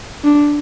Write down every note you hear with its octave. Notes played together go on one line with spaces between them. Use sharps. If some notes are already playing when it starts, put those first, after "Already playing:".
D4